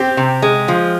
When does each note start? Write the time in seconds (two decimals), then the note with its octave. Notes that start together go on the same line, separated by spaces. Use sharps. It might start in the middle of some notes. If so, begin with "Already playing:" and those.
Already playing: C4 G4
0.17 C3
0.42 G#3
0.68 F3